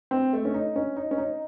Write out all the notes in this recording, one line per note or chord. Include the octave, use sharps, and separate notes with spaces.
C4
A3
C#4
D#4
C#4
D#4
C#4
D#4